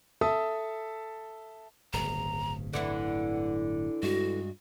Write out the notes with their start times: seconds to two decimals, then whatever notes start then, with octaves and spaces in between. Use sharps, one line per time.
0.21 A4 E5 A5 D#6
1.93 D1 G1 C#3 A#5
2.73 D3 E3 E4 F#5
4.03 G2 G#3 F#4